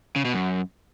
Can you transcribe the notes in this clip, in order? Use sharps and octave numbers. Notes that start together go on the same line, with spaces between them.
C#3
B2
F#2